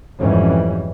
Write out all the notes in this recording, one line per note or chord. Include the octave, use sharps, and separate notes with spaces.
F2 G#2 E3 G3 C#4